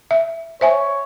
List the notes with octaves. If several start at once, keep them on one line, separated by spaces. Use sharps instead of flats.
E5
C5 C#5 E5 G#5